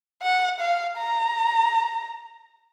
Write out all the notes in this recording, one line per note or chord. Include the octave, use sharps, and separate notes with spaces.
F#5
F5
A#5